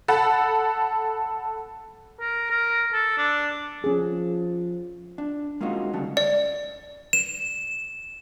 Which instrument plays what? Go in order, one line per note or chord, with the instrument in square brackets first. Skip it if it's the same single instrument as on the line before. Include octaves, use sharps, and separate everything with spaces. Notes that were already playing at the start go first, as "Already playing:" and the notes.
[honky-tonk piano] A4 F#5 A5 B5
[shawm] A#4
A#4
A4
D4
[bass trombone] F3 [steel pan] C#4 G#4
[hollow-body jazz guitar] D4
G#3 A#3 C#4 D#4 F4 F#4
D2 C#3 F#3 G3 A5
[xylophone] D5
[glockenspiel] E7